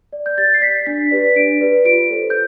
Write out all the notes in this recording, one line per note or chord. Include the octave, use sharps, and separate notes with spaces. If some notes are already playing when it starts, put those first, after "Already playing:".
D5
G6
G4 A6
C7
D5 B6
D4 B6
G4 B4 D5
D4 D7
G4 B4 D5
F4 D7
A4 C5
G6